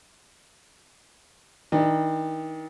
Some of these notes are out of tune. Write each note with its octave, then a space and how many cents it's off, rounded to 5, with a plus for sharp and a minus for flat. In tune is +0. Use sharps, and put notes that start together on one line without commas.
D#3 +35 D4 +45